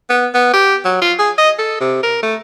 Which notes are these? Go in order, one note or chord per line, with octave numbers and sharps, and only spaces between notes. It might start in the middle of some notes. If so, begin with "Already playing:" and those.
B3
B3
G4
F#3
F4
G#4
D#5
A4
C3
A#4
A3